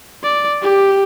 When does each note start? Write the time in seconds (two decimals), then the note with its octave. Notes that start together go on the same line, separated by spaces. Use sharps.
0.23 D5
0.62 G4